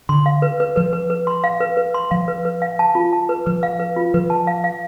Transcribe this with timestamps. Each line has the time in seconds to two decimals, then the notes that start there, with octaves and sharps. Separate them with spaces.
0.09 D3 C6
0.26 F5
0.42 B4
0.60 B4
0.76 F3 B4
0.93 B4
1.10 B4
1.27 C6
1.44 F5
1.60 B4
1.77 B4
1.94 C6
2.11 F3 F5
2.28 B4
2.45 B4
2.62 F5
2.79 A5
2.95 F4
3.13 A5
3.29 B4
3.46 F3 B4
3.63 F5
3.79 B4
3.96 F4
4.14 F3 B4
4.30 A5
4.47 F5
4.64 F5